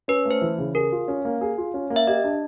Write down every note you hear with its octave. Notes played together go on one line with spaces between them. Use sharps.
C#4 B4
A3
C5
E3
C#3
G#4 A#4
F4
C#4
A#3
G#4
F4
C#4
A#3
E5
G4 D#5
D4